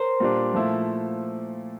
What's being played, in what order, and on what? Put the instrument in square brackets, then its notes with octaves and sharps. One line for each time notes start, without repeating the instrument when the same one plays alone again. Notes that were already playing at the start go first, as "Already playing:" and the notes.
Already playing: [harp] A#4 C5
[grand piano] A#2 G3 D4
A#2 F3 A3 E4